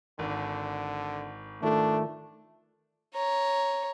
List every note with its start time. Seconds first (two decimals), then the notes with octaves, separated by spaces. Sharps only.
0.19 G#1 D3
1.63 D#3 A3 D4 F4 A4
3.14 C#5 A#5